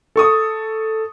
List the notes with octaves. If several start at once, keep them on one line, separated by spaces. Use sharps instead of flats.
A4 C#6 D#6